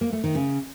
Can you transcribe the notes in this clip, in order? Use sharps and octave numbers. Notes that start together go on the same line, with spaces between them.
A#3
A3
D#3
C#3